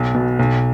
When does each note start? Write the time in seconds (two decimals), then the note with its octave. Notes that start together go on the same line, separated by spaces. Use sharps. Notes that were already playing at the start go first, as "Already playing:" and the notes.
Already playing: B1
0.14 B2
0.39 B1